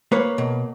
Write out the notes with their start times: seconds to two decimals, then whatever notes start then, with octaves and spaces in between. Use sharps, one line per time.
0.12 A#3 B4 C#5
0.38 B2